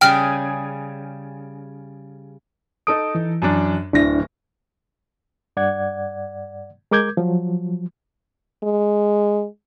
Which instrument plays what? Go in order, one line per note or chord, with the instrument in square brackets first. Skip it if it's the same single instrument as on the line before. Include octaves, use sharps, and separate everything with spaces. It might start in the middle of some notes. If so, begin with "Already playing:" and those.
[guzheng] C#3 G3 G#4 [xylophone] G5 F6
[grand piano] D#4 A4 D7 [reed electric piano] D#6
[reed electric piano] E3
[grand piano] F#2 D4
[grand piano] D1 A#6 [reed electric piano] D4 E4
[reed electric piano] G2 D5 F#5 G#6
G#3 A#4 D6 G6 G#6
F3 F#3
[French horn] G#3